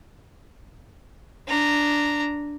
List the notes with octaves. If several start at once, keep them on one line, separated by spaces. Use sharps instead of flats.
D4 A#5